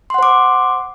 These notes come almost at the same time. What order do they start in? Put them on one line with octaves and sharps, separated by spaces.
C6 F#5 C5 D6